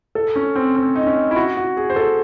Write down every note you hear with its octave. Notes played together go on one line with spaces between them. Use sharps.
A4
C#4
C4
C4
D#4
C#4
E4
F#4
F#4
G#4
C5
A4